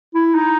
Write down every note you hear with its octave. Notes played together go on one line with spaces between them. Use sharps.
E4
D#4